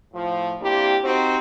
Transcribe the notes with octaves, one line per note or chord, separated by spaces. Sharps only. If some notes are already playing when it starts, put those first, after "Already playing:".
A2 F3
A#3 C4 D4 E4 G4
C4 D#4 F#4 G4 C5